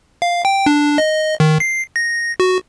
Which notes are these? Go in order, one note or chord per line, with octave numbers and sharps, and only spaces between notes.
F5
G5
D4
D#5
D#3
C7
A#6
F#4